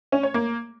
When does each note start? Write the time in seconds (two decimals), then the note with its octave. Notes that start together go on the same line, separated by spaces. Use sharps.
0.12 C#4
0.23 C#5
0.34 A#3